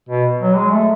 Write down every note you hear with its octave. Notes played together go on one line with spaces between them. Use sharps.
B2
F#3
G#3
A3